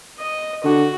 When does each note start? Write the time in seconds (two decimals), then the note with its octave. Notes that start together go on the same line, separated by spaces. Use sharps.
0.20 D#5
0.64 D3 F#4